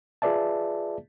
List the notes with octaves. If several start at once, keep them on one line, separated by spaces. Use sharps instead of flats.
F4 G#4 B4 D5 E5 A5